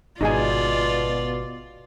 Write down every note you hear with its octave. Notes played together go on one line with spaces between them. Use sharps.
G#1 B2 D#4 F4 G#4 D5 G#5